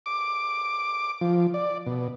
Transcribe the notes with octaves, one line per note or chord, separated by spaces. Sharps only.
D6
F3
D5
B2